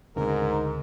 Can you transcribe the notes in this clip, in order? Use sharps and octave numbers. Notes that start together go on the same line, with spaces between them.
D2 G#2 C#3 C4 A#4